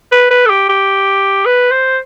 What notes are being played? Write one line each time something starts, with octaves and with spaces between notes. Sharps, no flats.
B4
B4
A4
G4
G4
B4
C5